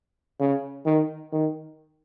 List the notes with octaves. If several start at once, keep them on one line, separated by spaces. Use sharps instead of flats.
C#3
D#3
D#3